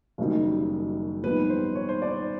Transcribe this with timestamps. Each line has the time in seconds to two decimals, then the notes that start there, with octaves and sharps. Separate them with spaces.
0.18 F#1 F#2 D#3 G3
1.23 A#1 G#2 D#3 G3 B3 B4
1.50 C5
1.75 C#5
1.89 C5
2.02 D5